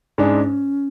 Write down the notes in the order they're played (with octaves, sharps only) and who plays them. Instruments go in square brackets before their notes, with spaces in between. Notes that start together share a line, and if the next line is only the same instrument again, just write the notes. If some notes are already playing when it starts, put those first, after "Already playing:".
[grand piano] G#2 G#3 D4 [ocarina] C#4